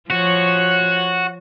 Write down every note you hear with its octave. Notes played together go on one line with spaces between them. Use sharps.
F3 F#4 C#5